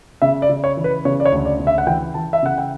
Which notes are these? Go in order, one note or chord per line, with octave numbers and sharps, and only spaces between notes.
C#3 E5
D5
C#3
C#5
E3
B4
C#3 C#5
D5
C#5
D2
D5
C#3
E5
F#5
E3 G5
E3 A5
E5
C#3 F#5
G5